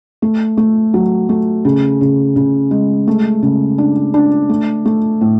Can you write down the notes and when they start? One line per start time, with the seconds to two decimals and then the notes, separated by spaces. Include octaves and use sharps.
0.22 A3
0.57 A3
0.94 F#3
1.29 A3
1.65 C#3
2.01 C#3
2.36 C#3
2.71 G#3
3.07 A3
3.42 C#3
3.78 D4
4.14 D4
4.49 A3
4.86 A3
5.21 A2